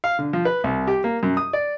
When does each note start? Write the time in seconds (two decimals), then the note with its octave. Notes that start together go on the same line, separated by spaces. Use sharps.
0.04 F5
0.19 D3
0.33 F3
0.45 B4
0.64 C2
0.88 G4
1.04 A#3
1.23 F#2
1.37 D#6
1.53 D5